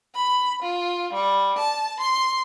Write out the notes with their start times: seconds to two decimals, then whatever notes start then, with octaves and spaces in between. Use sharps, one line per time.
0.15 B5
0.63 F4
1.13 G3
1.59 A5
2.00 C6